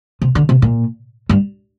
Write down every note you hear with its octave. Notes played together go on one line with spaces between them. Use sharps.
C3
D3
C3
A#2
G2